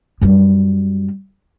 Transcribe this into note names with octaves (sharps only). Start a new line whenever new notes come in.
F#2 G3